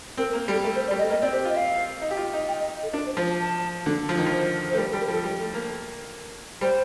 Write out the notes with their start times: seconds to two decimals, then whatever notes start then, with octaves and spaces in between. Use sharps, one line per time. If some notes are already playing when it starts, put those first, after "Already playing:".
0.17 C4 A#4
0.30 A#4
0.33 A#3
0.48 G3
0.52 A4
0.64 A3 A#4
0.75 C5
0.88 D5
0.91 G3
0.98 D#5
1.01 A3
1.10 A#3 D#5
1.21 C4 D5
1.33 G4 C5
1.45 F4 D#5
1.57 F5
2.01 D#4
2.11 G4
2.17 F4
2.33 D#4
2.48 G5
2.60 D#5
2.83 A4
2.93 D4 A#4
3.06 C5
3.17 F3 C5
3.29 A5
3.40 A5
3.86 D3
4.09 F3
4.18 D#3
4.26 F3
4.32 C5
4.70 A3 C5
4.77 G3 A#4
4.90 A4
4.93 G3
5.01 A#4
5.08 F3
5.12 A4
5.24 G3
5.40 A3
5.54 A#3
6.61 G3 C5